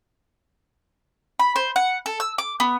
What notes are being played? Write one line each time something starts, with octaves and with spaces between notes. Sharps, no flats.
B5
C5
F#5
A4
E6
D6
B3